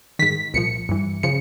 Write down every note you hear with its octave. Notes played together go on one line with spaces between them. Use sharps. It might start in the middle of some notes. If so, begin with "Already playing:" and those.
G#2 D#3 B6
C2 A#2 F3 C#7
G2 E3
C#3 F3 C#7